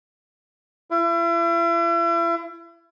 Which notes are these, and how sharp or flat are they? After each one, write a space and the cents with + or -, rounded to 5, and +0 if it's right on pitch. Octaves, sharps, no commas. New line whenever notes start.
E4 +40